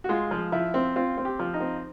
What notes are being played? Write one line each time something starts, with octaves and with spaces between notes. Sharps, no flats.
F#4
G#3 F4
F3
F3 E4
C4
C4 F4
C4
G4
F3
D#4
C4